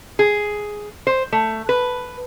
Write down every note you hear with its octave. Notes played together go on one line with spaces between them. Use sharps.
G#4
C5
A3
B4